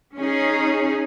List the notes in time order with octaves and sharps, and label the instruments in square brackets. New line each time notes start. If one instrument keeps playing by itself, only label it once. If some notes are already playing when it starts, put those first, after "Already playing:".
[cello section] C#4 D#4 G#4